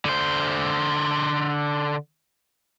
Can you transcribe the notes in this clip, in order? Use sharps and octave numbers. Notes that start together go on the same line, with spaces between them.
D3 C5